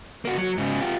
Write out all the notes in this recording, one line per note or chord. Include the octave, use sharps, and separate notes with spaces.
A#3 F#4
F#3
G#2 C#3
F4 G4